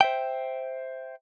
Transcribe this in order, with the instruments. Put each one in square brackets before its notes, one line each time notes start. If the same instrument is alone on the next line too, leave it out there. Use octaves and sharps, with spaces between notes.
[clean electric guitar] C5 E5 G5